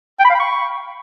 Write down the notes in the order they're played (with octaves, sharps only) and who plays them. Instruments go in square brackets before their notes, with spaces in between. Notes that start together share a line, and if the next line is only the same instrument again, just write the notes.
[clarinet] G5
B5
F5
B5
C#6